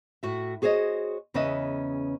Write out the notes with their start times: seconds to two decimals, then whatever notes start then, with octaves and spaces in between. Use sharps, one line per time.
0.23 A2 F#4 E5
0.62 F#4 G#4 C5 C#5 D#5
1.34 E2 C#3 C#4 B4 D#5 E5